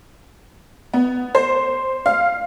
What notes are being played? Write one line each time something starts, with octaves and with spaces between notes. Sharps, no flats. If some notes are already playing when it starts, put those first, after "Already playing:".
B3
C5
F5